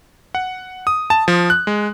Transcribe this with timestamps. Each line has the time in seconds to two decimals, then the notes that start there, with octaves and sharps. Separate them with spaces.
0.35 F#5
0.87 D#6
1.10 A5
1.28 F3
1.50 F#6
1.67 G#3